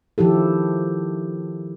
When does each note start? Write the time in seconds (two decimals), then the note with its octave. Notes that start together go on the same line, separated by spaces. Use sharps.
0.18 D#3 F3 E4 G4 A4